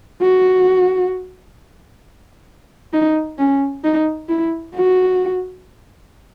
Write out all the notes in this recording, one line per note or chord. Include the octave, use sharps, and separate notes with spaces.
F#4
D#4
C#4
D#4
E4
F#4